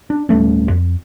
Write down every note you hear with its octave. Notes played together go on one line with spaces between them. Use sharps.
D4
D1 G3 A3 C#4
F2